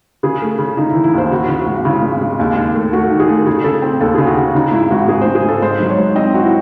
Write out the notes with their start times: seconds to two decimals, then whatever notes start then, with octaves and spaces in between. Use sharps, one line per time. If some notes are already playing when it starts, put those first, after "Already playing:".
0.23 C#3 G#4
0.42 A3
0.59 C#3
0.77 C#3 D#4
0.90 E4
0.95 E3
1.04 E4
1.14 D#2 C5
1.31 C#3 F#4
1.48 C#3
1.58 F#4
1.66 G#1
1.85 C#3 E4
2.03 G#1
2.21 G#3
2.39 D#2
2.57 D#2
2.75 A3
2.93 A3 F#4
3.11 D#3
3.20 G#4
3.29 A3
3.46 C#3 G#4
3.64 C#3 A4
3.82 C4
4.00 D#2 A4
4.14 C#3 G#4
4.27 F#4
4.37 C#3
4.54 C#3 D#4
4.72 G#1 E4
4.91 G#1 F#4
5.08 G#1 G#4
5.21 G#1 C5
5.35 G#4
5.45 G#1 A4
5.62 G#2 C5
5.80 F#3
5.90 C#5
5.98 G#2
6.16 C4 D#5
6.34 C4 F#4
6.43 E4